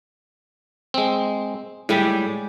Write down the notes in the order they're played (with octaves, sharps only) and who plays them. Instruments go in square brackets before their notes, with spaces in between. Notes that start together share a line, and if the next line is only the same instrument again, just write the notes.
[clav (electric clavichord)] G#3 C4
[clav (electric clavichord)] A2 G3 [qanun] G#3 G4 D5